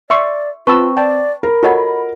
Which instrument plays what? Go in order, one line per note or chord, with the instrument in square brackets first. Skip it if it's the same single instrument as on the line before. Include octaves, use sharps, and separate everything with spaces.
[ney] D5 [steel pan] E5 C6 C#6
[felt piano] C4 [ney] F4 [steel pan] B4 A5 E6 [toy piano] C#6
[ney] D5 [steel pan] G5 A5
[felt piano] A#4 [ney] B5
[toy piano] F4 D#5 F#5 [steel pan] F#4 A4 C#5